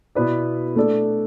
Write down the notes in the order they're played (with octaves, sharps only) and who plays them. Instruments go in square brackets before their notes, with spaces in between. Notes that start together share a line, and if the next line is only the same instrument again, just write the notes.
[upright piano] B2 B3 E4 B4 D5
A3 D4 A4 D5